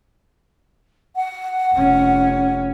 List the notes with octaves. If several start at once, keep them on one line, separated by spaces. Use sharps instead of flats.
F#5
F1 C#4